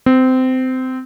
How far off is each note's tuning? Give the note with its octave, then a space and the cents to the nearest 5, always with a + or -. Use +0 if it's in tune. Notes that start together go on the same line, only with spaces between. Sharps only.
C4 -20